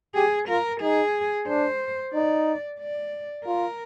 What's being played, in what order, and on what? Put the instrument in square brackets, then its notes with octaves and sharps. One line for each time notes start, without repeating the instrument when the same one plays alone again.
[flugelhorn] G4 [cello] G#4
[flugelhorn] F4 [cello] A#4
[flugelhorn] D#4 [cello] G#4
[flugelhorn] D4 [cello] C5
[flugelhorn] D#4 [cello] D5
[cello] D5
[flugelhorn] F4 [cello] A#4